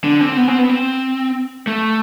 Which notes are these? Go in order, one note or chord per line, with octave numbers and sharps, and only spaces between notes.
D3
C4
B3
C4
B3
C4
A3